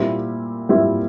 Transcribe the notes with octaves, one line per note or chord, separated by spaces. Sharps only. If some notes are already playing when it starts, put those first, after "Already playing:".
Already playing: A#2 G3 C4 E4 G4
A#2 G3 C4 E4 G4